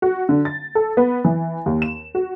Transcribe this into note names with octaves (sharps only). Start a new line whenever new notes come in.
F#4
D3
A6
A4
B3
E3
D#2
E7
F#4